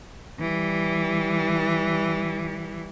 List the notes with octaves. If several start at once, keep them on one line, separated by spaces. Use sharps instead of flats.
E3 G3